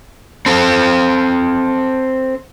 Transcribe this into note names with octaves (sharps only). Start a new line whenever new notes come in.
C4 A4